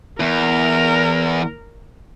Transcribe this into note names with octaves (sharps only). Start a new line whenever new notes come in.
E2 A#4